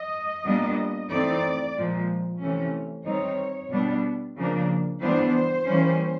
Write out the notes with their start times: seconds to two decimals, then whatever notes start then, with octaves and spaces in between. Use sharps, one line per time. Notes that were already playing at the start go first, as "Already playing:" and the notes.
Already playing: D#5
0.45 A#2 G3 B3 D4
1.10 E3 A3 C4 D#4 D5
1.75 A#2 F3 G#3
2.41 C3 E3 A3 C#4
3.06 D#3 G3 C4 D#4 C#5
3.71 B2 G3 B3 D4
4.36 C#3 F3 A#3 D4
5.01 E3 G3 B3 D4 C5
5.66 E3 G3 A#3 C#4